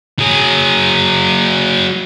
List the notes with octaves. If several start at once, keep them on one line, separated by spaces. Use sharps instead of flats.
F#3 G#4